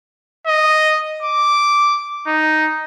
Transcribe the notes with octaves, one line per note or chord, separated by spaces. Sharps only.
D#5
D6
D#4